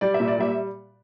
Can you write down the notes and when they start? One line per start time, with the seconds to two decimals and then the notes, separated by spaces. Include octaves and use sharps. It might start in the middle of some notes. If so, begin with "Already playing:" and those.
0.01 G3 D5
0.14 E5
0.20 A#2
0.27 D5
0.38 G3 E5